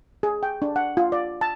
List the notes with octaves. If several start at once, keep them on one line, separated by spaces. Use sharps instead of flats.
G#4
G5
D4
F#5
F4
D5
A5